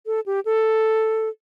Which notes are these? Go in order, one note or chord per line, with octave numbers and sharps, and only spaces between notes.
A4
G4
A4